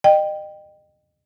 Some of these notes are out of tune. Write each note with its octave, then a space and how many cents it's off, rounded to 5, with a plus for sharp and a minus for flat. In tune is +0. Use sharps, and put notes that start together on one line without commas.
D#5 -35 G5 +0